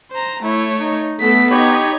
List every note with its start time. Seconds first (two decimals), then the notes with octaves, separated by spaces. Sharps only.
0.11 C5 A#5
0.43 A3 E4 C#5
0.80 D#4
1.20 A3 B3 A4 B6
1.51 D#4 G4 C#5 B5 G#6